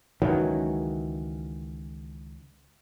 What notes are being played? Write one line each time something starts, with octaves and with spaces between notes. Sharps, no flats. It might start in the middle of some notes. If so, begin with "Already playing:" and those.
C#2 D#3 E3 F#3